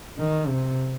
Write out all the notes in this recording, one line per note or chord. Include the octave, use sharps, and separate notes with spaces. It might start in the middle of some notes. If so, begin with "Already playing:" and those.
D#3
C3